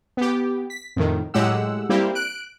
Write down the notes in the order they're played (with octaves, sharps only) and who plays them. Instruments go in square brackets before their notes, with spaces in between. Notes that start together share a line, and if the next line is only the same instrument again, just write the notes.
[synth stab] B3 G4
B6
F2 A2 D#3
A2 F#3 G#3 G4 F#5 E6
G3 A#3 C4 E4 G4
F#6 D7